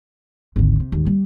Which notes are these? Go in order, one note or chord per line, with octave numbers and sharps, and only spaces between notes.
G#1 D2
C3
D#2 G#2
G3